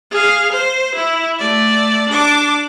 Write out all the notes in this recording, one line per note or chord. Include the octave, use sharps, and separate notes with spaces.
G#4 F5
C5
E4
A3 D5
D4 D6